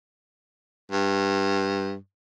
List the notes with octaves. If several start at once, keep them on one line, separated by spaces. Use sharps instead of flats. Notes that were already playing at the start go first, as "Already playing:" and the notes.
G2